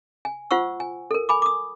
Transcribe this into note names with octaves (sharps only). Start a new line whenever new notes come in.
G#5
F4 C5 F#5 C#6 E6
G#5
A4 A#4
G#5 B5 D6
D6 D#6